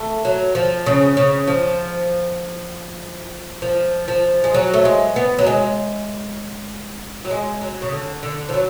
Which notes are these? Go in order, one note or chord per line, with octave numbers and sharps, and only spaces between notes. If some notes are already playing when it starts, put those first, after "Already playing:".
Already playing: A3
F#3
F3
C#3
C#3
F3
F3
F3
G#3
F#3
A3
G#3
B3
F#3
G#3
F#3
G#3
F#3
C#3
D3
D3
F3
F#3